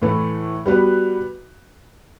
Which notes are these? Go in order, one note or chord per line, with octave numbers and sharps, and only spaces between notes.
A2 E3 A3
G3 B3 F#4 B4